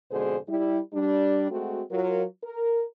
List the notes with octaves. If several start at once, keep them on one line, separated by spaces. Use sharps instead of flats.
F2 B2 D3 G#3 G#4 C5
G3 E4
G3 D4
G#3 A3 C4 F#4
F#3 F4 A#4
A#4